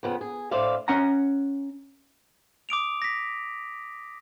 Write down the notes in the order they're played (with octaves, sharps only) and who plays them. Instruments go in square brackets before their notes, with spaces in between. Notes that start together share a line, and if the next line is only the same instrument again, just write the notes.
[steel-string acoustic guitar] F2 C#3 B3
G#4
A2 D4 C5 D5 E5 F5
[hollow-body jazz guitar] C#4 F#5 A#5
[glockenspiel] D6 D#6 D7 F7
A#6 B6